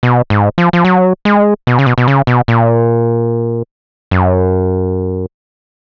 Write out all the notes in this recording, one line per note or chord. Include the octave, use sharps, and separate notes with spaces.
B2
G#2
F3
F3
F#3
G#3
B2
C#3
B2
B2
C#3
B2
A#2
F#2